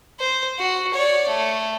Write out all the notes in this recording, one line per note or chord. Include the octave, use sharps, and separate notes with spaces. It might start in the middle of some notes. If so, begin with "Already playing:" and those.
C5
F#4
C#5 D5
A3